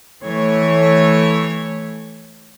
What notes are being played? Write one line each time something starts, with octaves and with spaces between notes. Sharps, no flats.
E3 A3 C#5